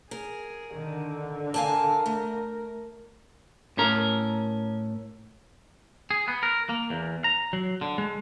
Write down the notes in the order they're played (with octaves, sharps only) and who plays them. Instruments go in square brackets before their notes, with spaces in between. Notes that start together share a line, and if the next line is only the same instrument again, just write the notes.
[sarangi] G#4 [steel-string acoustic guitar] A#4
[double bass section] D3 [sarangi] D#3
[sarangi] A#4 [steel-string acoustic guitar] F5 G#5 A5
[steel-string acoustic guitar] A3
[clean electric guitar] A2 C#4 A#4
G#4
B3
A#4
A#3
E2
A#5
F#3
D3
G#3